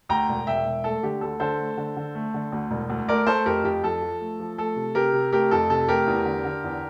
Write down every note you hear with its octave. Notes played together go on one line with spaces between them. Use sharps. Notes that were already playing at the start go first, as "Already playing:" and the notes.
D2 G5 A#5
E1
E1 E5 G5
E1
A3 A4
D3 G4
D2 A4
D3 A4 C5
A3
D3
D3
A3
D3
D2
E1
D2
A3 A#4 D5
A3 A4 C5
F2 G4 A#4
F2 G4
F3 A4
F3
A3
F3
A3 A4
C3
C3 G4 A#4
C3
A3 G4 A#4
F2 A4
C3 A4
A3 G4 A#4
E2
D3
D3
E2